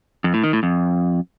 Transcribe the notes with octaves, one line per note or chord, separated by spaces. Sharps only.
F2
A2
D#3
A2
F2